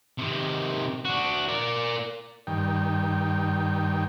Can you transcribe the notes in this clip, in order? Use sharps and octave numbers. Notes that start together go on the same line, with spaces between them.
C3 D#3
D4 F#4
A#4 D5
G2 D#3 G5